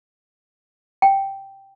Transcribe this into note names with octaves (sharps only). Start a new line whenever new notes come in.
G5